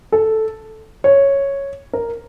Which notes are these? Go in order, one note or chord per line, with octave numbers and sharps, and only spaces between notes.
A4
C#5
A#4